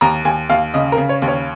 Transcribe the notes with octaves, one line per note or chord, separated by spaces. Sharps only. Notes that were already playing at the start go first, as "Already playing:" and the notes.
D#2 A#5
D#2 G#5
D#2 F5
C#3 D#5
A#4
C#3
C#5
D#2
C#5